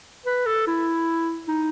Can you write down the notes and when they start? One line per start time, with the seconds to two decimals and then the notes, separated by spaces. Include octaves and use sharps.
0.26 B4
0.46 A4
0.67 E4
1.48 D#4